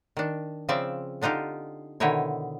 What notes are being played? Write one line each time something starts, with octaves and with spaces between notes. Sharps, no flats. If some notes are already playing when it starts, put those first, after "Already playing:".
D#3 D4
C#3 F3 C4 D5 E5
D3 D4 D#4 F4 G4
B2 D3 D#3 D#4 E4 C#5